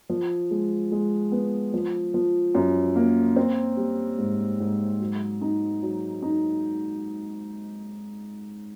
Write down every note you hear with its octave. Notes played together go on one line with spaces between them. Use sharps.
F3
G#3
G#3
B3
F3
F3
F#2
A#3
C4
G3
G#2
G#2
F#3
D#4
F#3
D#4